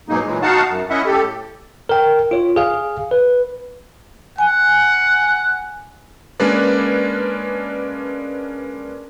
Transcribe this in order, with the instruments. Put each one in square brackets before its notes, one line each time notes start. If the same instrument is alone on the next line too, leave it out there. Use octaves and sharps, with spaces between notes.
[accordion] G#2 B2 F#3 G#3 A#3 D#4
A#2 E3 F#3 G#3
D#4 F#4 F5 F#5 A5
F#2
C#4 E4 D#5 E5 F#5
A2 G4 A4
[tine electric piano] A#4 G5
F4 C#5
G#4 F5
B4
[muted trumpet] F#5 [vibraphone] G#5
[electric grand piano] G#3 A#3 C#4 D4 B4 D5